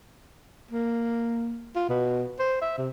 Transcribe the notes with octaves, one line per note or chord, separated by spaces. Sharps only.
A#3
F4
B2
C5
E5
C3